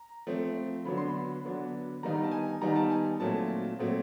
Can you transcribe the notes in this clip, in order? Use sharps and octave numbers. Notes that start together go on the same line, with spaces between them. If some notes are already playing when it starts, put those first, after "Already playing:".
Already playing: A#5
F3 A3 C4
D3 F#3 B3 D4 B5
C6
B5
D3 F#3 B3 D4
D#3 G3 B3 D#4 A#5
A5
G#5
D#3 G3 B3 D#4 A#5
A5
G#5
A#2 F#3 A3 C4 A5
A#2 F#3 A3 C4